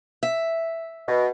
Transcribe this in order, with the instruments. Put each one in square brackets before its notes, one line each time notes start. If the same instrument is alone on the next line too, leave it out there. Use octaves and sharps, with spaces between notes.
[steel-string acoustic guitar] E5
[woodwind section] B2